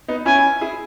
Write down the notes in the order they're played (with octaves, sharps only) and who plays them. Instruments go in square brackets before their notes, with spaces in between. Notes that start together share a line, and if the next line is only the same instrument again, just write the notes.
[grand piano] B3 D#4
[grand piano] C#4 E4 [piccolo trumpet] G#5
[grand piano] E4 G#4